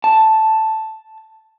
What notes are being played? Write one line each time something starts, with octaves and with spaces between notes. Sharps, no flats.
A5